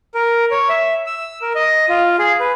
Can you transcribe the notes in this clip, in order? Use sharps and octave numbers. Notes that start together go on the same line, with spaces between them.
A#4
C#5
E5
E6
A#4
D#5
F4
G#4
B4